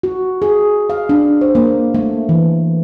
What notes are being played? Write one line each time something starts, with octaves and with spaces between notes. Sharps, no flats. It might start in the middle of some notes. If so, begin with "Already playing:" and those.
F#4
G#4
F5
D4
C5
A#3
A3
E3